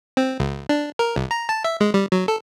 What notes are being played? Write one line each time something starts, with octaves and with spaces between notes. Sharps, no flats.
C4
C#2
D4
A#4
C2
A#5
A5
E5
G#3
G3
F#3
A4